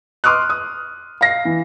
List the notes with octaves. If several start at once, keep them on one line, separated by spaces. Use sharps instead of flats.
C6 D6 D#6 F6 F#6
D#6
F5 A#6 C7
E3